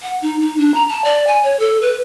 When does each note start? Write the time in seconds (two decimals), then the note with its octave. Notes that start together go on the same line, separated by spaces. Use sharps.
0.02 F#5
0.22 D#4
0.41 D#4
0.58 D4
0.74 A#5
0.89 A5
1.04 D5
1.27 G#5
1.43 C#5
1.60 A4
1.82 B4